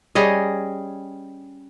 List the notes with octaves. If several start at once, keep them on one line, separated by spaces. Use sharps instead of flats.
G3 C#4 G#4 D#5